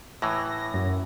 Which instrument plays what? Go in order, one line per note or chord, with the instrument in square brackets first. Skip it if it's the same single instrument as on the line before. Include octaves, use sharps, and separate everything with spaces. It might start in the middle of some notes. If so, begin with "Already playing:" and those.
[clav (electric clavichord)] A2 E3 [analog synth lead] A#6
[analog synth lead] F#2